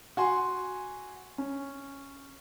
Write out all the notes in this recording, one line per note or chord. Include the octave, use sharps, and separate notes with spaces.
F#4 G#5 C6
C#4